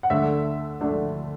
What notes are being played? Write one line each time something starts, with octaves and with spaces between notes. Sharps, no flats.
F#5
D2 D3 A3 D4 E5
D2 D3 A3 D4